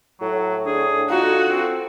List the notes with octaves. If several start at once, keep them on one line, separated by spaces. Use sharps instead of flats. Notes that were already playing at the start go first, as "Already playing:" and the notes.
A2 F#3
D4 G#4
D#4 F4 F#4 A4
C4